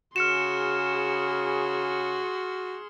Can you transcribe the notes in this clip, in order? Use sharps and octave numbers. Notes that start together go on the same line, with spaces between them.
C#3 F#4 G#4 C6 F6 C#7 E7